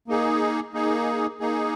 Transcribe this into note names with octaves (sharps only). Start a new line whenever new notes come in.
A#3 D#4 G#4
A#3 D#4 G#4
A#3 D#4 G#4